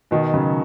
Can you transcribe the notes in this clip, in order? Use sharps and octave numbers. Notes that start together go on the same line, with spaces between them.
B2 D#3
C#3 F#3